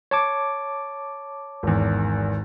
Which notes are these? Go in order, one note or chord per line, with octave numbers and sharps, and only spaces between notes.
C#5 A5 D6
G#1 E2